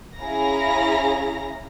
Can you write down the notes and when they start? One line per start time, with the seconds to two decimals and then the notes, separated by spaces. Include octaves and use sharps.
0.18 C#4 E4 G#4 F5 A#5 A#6